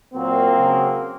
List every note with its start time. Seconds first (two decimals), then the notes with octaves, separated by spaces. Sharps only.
0.14 A#2 F#3 A#3 C4
0.55 C#3 F#3